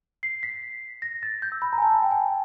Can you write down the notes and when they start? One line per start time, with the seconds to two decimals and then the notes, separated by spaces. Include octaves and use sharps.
0.23 C7
0.43 B6
1.02 A#6
1.23 A6
1.42 G6
1.52 E6
1.62 B5
1.73 A#5
1.78 G#5
1.82 A5
1.92 G#5
2.02 G5
2.11 G#5